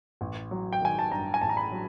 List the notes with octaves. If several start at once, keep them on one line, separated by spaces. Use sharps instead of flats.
A1
F#3
G5
D#3 G#5
A5
G2 A#5
G#5
A1 A5
A#5
B5
F#3